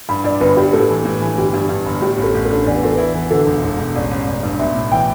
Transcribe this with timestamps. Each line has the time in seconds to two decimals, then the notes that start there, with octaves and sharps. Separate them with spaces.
0.09 G2 B5
0.24 G2 D5
0.41 G1 B4
0.56 G2 G4
0.73 A2 A4
0.90 E3
1.05 A2
1.22 E3
1.38 G1 G4
1.54 G2
1.69 G2
1.86 G1
2.01 A2 G4
2.18 A1
2.23 A4
2.34 A1
2.45 A4
2.50 D4
2.66 E2 D5
2.76 B4
2.83 E2 A4
2.94 E4 B4
3.15 E3
3.30 D3 A4
3.47 E1
3.63 E1
3.79 E1
3.95 A1 D5
4.11 A1
4.27 A1
4.43 G2
4.59 B1 E5
4.75 A2
4.91 E3 G5